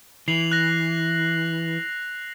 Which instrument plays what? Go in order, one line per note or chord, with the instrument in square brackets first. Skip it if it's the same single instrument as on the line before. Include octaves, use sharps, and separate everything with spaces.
[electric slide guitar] E3 [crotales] C7 F7 F#7
[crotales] F#6 A#6